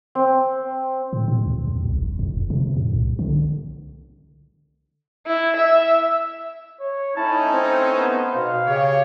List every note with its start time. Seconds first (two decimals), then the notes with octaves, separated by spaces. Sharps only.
0.15 C4
1.13 A2
1.28 B2
1.44 D2
1.67 E2
1.86 C2
1.99 F#1
2.19 F2
2.50 C3
2.77 A2
2.93 C2
3.19 D3
5.27 E4
5.56 E5
6.80 C#5
7.17 A3 C#4 D#4 E4 A5
7.53 C4 C5
7.96 B3
8.35 B2 F5
8.66 C#3 G4 C#5